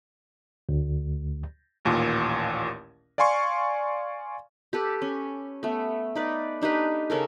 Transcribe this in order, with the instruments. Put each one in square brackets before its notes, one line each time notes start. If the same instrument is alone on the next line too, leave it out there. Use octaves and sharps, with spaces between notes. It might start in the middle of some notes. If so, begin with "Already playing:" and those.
[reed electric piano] D2
[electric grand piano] A1 D#2 A#2
D5 F5 G#5 C6 C#6
[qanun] G4 A4 B4
C#4
A3 B3
D#4 B4 D5
D4 D#4 G4 B4
C#3 C#4 A4 A#4